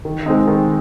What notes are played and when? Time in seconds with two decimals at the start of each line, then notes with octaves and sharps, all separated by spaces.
0.05 D#3
0.26 G#3 C4 D#4
0.48 D#3